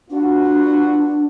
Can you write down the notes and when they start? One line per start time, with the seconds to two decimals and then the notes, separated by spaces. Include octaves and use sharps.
0.10 B3 D4 F4 F#4